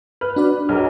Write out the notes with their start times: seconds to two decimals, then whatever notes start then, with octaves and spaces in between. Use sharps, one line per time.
0.21 B4 F6
0.36 D4 F#4 D5
0.69 B1 G#4 A#4 F6